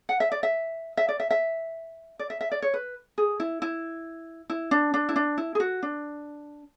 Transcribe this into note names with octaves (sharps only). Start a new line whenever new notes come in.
F#5
E5
D5
E5
E5
D5
E5
E5
D5
E5
E5
D5
C#5
B4
G#4
E4
E4
E4
D4
D4
E4
D4
E4
G#4
F#4
D4